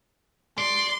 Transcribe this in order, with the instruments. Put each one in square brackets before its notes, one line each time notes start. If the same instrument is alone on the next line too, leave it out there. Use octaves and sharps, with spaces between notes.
[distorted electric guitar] D5 [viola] C6